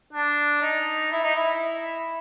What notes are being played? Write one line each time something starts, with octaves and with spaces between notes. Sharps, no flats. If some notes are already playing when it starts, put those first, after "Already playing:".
D4
D#4
E4
D#4
E4